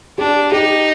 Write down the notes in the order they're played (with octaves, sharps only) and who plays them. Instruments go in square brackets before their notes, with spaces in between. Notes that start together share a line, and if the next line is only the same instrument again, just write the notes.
[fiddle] D4 [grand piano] G4
[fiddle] D#4 [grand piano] G4